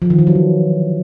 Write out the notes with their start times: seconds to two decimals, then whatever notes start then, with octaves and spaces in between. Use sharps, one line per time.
0.02 F3
0.10 D#3
0.18 E3
0.27 F#3
0.35 D3